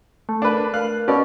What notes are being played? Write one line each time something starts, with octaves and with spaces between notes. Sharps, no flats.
A3
D4 A#4 B4
A#4 F5 F#6
B2 C#4 D5